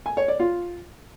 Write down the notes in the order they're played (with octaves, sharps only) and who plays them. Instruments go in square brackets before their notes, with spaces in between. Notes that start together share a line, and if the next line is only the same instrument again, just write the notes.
[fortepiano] G#5
C#5
D5
F4